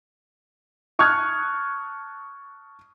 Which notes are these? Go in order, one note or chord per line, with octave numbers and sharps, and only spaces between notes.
A5 C#6 D#6 F6 F#6 G#6